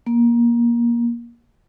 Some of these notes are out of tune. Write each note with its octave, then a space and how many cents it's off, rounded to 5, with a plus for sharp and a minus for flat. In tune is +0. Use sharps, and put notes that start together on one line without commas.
A#3 +20